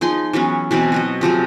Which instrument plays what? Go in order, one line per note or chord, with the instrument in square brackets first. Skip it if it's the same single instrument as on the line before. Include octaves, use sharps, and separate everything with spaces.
[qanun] F3 D#4 G#4 C6
E3 F#3 B3 C#4
B2 E3 F#3 C4
F#3 F#4 D#5
C3 F3 F#3 G#4